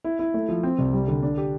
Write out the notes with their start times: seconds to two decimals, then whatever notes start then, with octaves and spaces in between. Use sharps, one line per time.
0.04 E4
0.19 E4
0.34 A3
0.49 F3
0.63 C4
0.79 C2
0.93 G3
1.08 D3
1.22 D4
1.37 G4